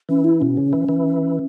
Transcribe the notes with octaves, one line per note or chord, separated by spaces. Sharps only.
E3 C#4
E4
B2 C#4
C#3
E3
E3